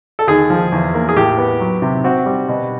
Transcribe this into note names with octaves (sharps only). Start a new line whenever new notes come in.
A4
D#2 G#4
F3
E2
A#3
G#4
A2 G4
B3
F#3
C3
C4 F#4
G3
B2